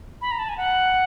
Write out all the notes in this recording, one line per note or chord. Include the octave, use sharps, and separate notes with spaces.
B5
A#5
A5
G#5
F#5